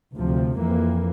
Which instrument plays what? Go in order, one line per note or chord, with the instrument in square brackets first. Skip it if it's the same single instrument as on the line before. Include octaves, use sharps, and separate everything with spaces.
[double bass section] D2 C3 F3
F2 E3 A#3